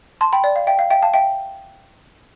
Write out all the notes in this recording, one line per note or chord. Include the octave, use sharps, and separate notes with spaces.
A5 C6
G5 B5
D5
F5
E5 G5
F5
E5 G5
F5 A5
E5 G5